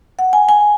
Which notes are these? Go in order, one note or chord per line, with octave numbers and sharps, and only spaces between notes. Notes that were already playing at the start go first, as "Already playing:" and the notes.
F#5
G#5
G#5